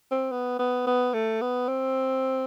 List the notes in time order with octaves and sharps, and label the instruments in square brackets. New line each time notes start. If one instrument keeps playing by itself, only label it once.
[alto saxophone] C4
B3
B3
B3
A3
B3
C4